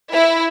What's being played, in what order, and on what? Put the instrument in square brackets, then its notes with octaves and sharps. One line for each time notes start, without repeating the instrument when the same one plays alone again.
[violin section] E4